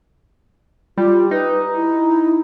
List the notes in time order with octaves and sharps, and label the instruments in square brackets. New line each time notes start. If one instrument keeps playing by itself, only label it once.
[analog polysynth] G3 [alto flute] F4
[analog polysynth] D#4 [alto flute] B4
[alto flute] E4